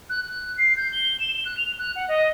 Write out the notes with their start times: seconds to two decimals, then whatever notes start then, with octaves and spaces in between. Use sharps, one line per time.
0.09 F#6
0.24 F#6
0.57 C7
0.76 G6
0.92 G7
1.19 E7
1.34 G7
1.45 F#6
1.57 F7
1.79 F#6
1.95 F#5
2.08 D#5